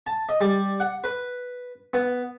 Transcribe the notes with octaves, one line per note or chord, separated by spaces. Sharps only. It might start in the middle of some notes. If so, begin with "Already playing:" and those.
A5
D#5
G3
F#5
B4
B3